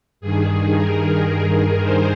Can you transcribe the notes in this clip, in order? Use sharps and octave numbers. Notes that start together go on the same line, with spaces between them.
G2 D#3 G#4
A#4
C5